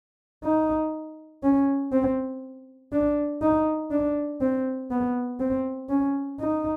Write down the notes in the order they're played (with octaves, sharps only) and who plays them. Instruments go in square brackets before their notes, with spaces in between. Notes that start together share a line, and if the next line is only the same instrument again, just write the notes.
[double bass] D#4
C#4
C4
D4
D#4
D4
C4
B3
C4
C#4
D#4